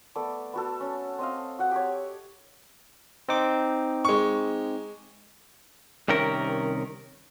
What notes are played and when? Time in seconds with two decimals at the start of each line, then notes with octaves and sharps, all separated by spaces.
0.15 A3 B3 A4 D5
0.53 B3 F#4 A4
0.80 C#4
1.19 C4 D#5 F5
1.59 F#4 F#5
1.71 G4 C#5
3.29 C4 D#4 D6
4.05 G#3 C#6
6.08 C2 C3 D#3 C#4 A#4